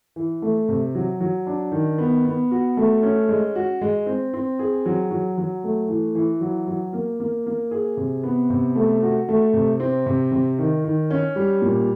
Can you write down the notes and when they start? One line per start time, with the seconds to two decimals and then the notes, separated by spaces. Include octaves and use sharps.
0.16 E3
0.42 A3
0.69 C3
0.95 F#3
1.21 F#3
1.47 D4
1.72 D#3
1.98 B3
2.25 B3
2.51 F#4
2.77 A3
3.03 C#4
3.29 G#3
3.55 F#4
3.81 G#3
4.06 C4
4.34 C4
4.59 G#4
4.86 F#3
5.11 F#3
5.38 F#3
5.64 A3
5.89 E3
6.15 E3
6.41 F#3
6.67 F#3
6.93 A#3
7.20 A#3
7.46 A#3
7.71 G#4
7.97 C3
8.23 B3
8.50 C3
8.75 A3
9.02 F#4
9.29 A3
9.53 C3
9.80 C4
10.06 C3
10.32 C3
10.59 D#3
10.84 D#3
11.10 C#4
11.36 G3
11.62 A#2